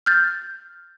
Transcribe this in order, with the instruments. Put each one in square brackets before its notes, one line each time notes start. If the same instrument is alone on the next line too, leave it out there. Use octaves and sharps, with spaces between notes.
[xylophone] F6 G6 A6